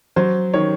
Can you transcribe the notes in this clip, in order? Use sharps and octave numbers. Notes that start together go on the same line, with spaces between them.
F#3 C5
D#3 C#5